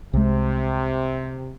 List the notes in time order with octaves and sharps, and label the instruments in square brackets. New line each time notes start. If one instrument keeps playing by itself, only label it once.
[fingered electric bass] C2 G#3 [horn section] C3